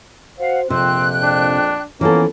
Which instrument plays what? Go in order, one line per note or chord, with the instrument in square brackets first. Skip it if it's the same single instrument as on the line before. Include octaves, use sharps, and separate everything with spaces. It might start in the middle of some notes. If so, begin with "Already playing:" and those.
[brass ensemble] F#4 C5 [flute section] F5 F#5
[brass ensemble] A#1 F2 [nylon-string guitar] C3 [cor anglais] C4 [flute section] G5 F#6
[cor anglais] D4
[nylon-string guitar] E3 A4 [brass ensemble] F3 B3 C#4 [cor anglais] A#3